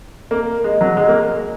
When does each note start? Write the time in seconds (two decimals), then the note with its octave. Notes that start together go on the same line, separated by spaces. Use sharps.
0.31 A#3
0.64 G#3
0.81 F#3
0.97 G#3
1.08 A#3